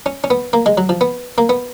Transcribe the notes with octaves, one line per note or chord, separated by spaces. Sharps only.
C#4
C#4
B3
A#3
G#3
F#3
F3
B3
A#3
B3